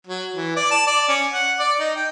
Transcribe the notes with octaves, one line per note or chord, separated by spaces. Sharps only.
F#3
E3
D5
A5
D5
C#4
F#5
D5
D#4
G5